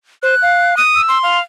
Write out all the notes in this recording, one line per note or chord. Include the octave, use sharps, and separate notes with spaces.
C5 F#6
F5
D#6
E6
C6
F5